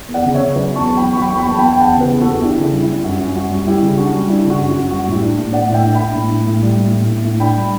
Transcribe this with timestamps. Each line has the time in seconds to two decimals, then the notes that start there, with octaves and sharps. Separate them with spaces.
0.09 E2
0.14 D5 F#5
0.24 C#3
0.34 C#5 E5
0.40 C#3
0.55 F#3 B4 D5
0.71 E2
0.76 A5 C#6
0.86 E2
0.97 G5 B5
1.02 F#3
1.13 C#6
1.17 F#3 G5 B5
1.30 E2 C#6
1.38 G5 B5
1.49 E2 A5
1.59 G5 B5
1.65 E2
1.73 G5
1.79 E2 F#5 A5
1.96 C#3 G4 B4
2.11 E2
2.21 F#4 A4
2.27 E2
2.42 D4 E4 G4
2.58 C#3
2.63 E4
2.73 G3
2.83 E4
2.88 G3
3.04 F#2 F#4
3.21 F#2
3.35 G3 F#4
3.50 G3
3.66 G3 E4 G4
3.82 C#3
3.97 D4 F#4
4.13 G3
4.28 D4 E4
4.45 C#3
4.50 F#4
4.61 F#2
4.70 F#4
4.76 F#2
4.91 G3 F#4
5.07 A2
5.12 E4 G4
5.22 D4
5.38 A2
5.53 A2 D5 F#5
5.68 A2
5.74 E5 G5
5.84 D4
5.95 D4 G5 B5
6.15 A2
6.31 A2
6.47 A2
6.62 G3
6.78 A2
6.93 A2
7.09 A2
7.25 A2
7.40 D4 G5 B5
7.56 G3